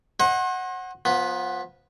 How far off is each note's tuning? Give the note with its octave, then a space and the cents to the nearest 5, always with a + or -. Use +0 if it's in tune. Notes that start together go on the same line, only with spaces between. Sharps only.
C5 +40 D#5 +20 F#5 +0
F3 +25 B3 -5